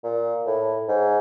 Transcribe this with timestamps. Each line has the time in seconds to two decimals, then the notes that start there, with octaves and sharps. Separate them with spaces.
0.04 A#2
0.46 A2
0.88 G#2